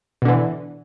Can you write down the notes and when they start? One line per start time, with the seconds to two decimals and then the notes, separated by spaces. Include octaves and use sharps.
0.22 B2
0.25 D3
0.28 E3